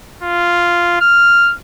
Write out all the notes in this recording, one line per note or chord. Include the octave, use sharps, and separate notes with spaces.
F4
F6